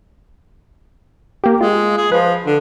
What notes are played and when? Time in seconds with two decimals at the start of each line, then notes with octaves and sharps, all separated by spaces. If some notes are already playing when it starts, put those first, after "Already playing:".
1.44 A#3 G4
1.61 G#3 F4
1.97 G#4
2.12 F3 B4
2.46 D3